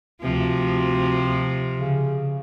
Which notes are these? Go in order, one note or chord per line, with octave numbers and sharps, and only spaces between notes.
D2 C3 F3
C#3